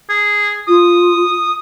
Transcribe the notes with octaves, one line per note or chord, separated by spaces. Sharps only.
G#4
F4 D#6